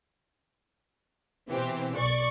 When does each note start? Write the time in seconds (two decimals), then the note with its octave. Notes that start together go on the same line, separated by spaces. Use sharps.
1.49 B2 E3 C4 G4
1.96 B1 D5 C#6 C#7